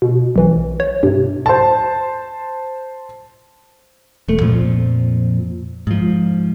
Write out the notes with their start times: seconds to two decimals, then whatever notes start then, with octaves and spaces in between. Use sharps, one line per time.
0.02 B2
0.36 B1 E3
0.80 C#5
1.03 G2 C3
1.46 C5 A5
4.28 E1 A3
4.40 F2 A#2 F3
5.87 G#2 F3